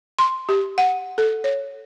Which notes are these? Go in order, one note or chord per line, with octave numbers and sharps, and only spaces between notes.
C6
G4
F#5
A4
C#5